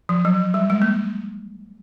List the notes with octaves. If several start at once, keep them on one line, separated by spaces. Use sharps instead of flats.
F3
F#3
G3
G#3
A#3